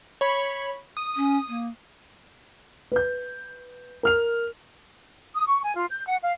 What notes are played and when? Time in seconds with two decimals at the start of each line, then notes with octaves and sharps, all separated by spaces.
0.21 C#5 B5
0.97 D#6
1.16 C#4
1.48 A#3
2.92 B4 G6
4.03 A#4 F6 F7
5.35 D#6
5.48 C#6
5.65 G#5
5.77 F4
5.90 G6
6.07 F#5
6.23 F5